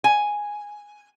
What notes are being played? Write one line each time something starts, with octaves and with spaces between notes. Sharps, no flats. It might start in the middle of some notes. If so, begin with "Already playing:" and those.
G#5